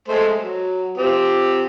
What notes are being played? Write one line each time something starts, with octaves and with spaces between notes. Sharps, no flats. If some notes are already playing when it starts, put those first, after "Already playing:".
G#3 A3 C5
F#3
C4 F4 G4